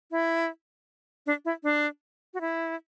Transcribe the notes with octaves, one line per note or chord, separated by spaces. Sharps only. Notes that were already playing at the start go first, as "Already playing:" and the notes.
E4
D4
E4
D4
F#4
E4